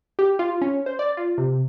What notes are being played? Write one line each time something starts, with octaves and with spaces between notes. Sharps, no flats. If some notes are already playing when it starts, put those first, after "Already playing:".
G4
F4
C#4
C5
D5
F4
C3